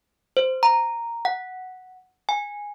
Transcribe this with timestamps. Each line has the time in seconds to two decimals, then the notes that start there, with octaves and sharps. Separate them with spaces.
0.37 C5
0.63 A#5
1.25 F#5
2.29 G#5